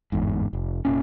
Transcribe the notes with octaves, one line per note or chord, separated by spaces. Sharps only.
G1 E2 G#2
F1
F1 A#2 C#4